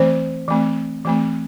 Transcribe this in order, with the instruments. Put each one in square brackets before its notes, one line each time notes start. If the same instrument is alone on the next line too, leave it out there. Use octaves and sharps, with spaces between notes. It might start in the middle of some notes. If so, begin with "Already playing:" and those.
Already playing: [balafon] E3 A3 C4 C5
E3 A3 C4
E3 A3 C4